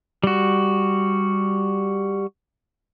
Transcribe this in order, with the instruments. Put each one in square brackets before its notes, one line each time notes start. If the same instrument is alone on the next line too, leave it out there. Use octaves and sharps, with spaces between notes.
[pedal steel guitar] G3 F#4